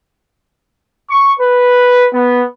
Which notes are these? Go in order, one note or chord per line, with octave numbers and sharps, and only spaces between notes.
C#6
B4
B3